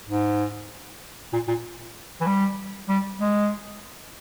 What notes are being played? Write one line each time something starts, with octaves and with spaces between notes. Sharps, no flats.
G#2
A#2
A#2
E3
G3
G3
G#3